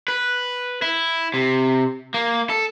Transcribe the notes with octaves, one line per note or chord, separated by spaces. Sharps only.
B4
E4
C3
A#3
A4